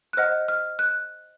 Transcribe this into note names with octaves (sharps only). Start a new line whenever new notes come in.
F#6
C5 D#5 F#5 F6
F6
F#6